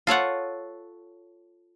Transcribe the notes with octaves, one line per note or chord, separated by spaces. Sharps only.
F4 A4 C#5 F#5